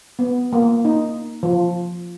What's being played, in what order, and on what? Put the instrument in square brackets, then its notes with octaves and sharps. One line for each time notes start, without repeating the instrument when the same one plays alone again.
[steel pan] B3
A#3
D#4
F3